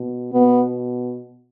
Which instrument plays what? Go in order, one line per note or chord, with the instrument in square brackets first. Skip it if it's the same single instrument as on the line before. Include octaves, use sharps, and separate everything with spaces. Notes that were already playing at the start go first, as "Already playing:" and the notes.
Already playing: [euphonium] B2
[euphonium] B2 [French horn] B3